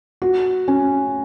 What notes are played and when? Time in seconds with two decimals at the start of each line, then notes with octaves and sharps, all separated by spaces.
0.22 F#4
0.68 C#4